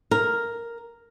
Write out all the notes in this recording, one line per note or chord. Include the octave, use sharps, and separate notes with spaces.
A#4